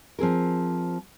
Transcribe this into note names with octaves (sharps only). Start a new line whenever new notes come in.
F3 C4 G#4 A#4